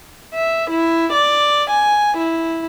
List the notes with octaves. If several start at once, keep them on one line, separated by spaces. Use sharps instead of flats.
E5
E4
D5
G#5
E4